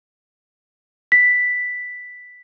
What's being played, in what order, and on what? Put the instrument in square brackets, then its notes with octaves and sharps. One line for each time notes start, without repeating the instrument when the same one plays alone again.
[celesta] B6